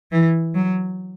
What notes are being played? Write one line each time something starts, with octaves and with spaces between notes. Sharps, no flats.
E3
F#3